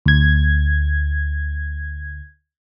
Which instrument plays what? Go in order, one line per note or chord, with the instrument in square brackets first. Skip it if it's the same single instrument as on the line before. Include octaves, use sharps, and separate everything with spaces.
[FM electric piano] D2 G#6